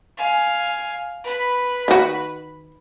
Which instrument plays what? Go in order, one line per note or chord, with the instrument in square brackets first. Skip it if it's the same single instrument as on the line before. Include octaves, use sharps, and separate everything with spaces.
[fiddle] F5 G#5
B4 B5
[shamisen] D#3 F#4